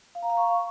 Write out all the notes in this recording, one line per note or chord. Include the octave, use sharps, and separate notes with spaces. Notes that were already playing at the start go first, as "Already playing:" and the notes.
F5
A#5
F5
C#6